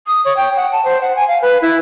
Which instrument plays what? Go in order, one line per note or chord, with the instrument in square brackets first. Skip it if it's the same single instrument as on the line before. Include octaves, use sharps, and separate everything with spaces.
[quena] D#6
C#5
G5
F#5
A5
C5
F#5
G#5
F5
B4
E4